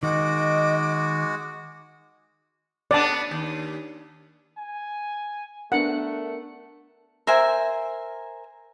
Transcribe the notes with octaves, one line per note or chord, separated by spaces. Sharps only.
D#3 G#3 F#4 D#5 D6
B3 D4 D5 A5
D#2
G#5
A3 B3 D4 A#4 F#5
A#4 C5 E5 G#5